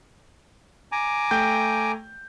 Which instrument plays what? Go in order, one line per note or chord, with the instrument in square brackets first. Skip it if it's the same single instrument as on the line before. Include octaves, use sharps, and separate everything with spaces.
[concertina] G#5 A#5 D6
[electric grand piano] A3 G5 G6